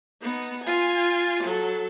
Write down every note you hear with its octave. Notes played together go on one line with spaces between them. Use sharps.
B3 D#4
F4 G#5
F#3 A4